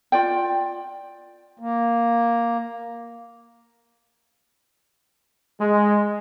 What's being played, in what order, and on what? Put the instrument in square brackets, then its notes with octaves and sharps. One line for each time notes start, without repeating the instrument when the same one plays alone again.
[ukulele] F4 D5 G5
[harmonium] A#3
[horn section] G#3